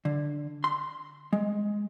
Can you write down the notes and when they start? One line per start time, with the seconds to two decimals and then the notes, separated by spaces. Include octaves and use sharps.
0.05 D3
0.64 C6
1.33 G#3